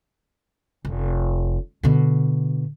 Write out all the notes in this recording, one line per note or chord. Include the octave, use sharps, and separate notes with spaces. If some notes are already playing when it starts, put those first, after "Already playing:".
F1
B2 D3